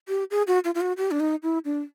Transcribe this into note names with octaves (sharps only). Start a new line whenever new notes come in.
G4
G#4
F#4
F4
F4
F#4
G4
D4
D#4
E4
D4